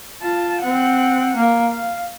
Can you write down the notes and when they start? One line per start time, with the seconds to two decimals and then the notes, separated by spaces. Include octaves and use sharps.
0.21 F4 A5
0.60 C4 F#5
1.36 A#3
1.71 F5